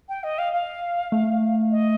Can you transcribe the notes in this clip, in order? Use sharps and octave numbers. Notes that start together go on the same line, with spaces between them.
G5
D#5
F5
F5
A3
D#5